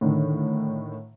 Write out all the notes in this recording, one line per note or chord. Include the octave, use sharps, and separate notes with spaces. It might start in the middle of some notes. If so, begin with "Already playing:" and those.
A2 D3 D#3